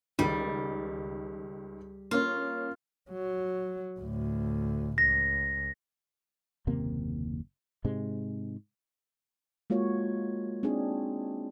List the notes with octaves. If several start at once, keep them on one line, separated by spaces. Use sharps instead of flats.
C#2 D#3 G3
A#3 C#4 F4
F#3
D2 A2
C#2 A#6
F#1 D#2 C3 A#3
G#2 C3 G#3
G#3 A#3 F4 F#4 C#5
C4 D4 D#4 G#4